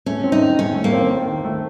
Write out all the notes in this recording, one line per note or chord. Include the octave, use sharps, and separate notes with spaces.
A3 C#4
C4
D#4
D#3
D#3 C#4
A3
A#3
C4
D#3
D#3
A3